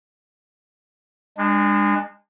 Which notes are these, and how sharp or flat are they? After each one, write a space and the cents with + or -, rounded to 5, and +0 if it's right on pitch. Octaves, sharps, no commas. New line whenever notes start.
G#3 -30 D4 +15